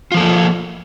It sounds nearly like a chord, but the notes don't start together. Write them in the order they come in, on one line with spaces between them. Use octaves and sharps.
F4 F3 A4 A#3